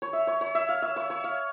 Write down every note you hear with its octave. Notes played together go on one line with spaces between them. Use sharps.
C#5
E5
C#5
C#5
E5
F5
E5
C#5
C#5
F5